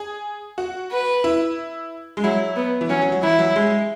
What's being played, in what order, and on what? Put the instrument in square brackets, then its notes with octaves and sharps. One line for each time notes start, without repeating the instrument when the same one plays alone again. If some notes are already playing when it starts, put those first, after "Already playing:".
Already playing: [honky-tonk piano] G#4
F#4
[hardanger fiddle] B4
[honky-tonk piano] E4
G#3
[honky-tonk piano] F#3 [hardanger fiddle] E4
[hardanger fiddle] B3
[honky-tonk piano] E3
[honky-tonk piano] F#3 [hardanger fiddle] C#4
[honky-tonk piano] F#3
F#3
[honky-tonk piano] E3 [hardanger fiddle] E4
[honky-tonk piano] F#3
G#3